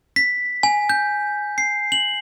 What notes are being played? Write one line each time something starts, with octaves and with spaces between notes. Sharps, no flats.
B6
G#5
G6
C7
F#7